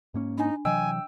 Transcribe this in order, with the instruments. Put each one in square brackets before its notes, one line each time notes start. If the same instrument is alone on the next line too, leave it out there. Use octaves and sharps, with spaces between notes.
[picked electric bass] G#2 A#3 C#4
[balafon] D4 G#5 [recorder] D#4
[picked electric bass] C3 E3 F#3 [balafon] D#5 [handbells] G5 E6 [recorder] G#5